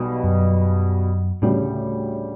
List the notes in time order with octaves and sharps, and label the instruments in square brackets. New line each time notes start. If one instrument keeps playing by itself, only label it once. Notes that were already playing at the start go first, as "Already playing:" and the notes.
Already playing: [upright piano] B1 B2 G3
[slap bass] F#2
[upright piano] D2 C#3 G3 C#4 [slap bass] A2